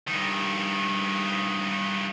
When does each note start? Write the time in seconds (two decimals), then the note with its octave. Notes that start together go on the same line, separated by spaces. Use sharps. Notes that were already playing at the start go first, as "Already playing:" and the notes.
0.08 G2 D#3